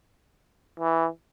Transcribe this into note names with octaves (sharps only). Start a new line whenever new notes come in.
E3